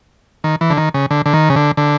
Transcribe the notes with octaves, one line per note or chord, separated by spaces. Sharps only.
D#3
E3
D3
D#3
C#3
D3
D3
D#3
C#3
D3
D3